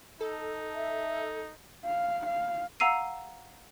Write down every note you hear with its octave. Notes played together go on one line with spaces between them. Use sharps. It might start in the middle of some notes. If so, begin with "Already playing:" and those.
D#4 A4
E5
F5
F5
F5 F#5 A#5 E6 C7 D#7